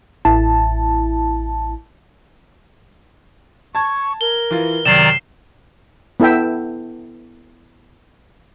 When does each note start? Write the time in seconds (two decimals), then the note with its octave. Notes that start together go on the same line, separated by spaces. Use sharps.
0.25 A1 E4 A5
3.75 A5 C#6 G#6
4.21 A#4 G7
4.51 E3 F4
4.85 F#2 C3 D#3 D5 A#5 C7 E7
6.20 B3 E4 A4 E5 G5